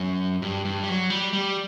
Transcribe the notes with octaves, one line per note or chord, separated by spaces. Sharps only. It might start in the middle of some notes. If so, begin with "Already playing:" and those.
Already playing: F#2
G2
G2
G3
F#3
G3
G3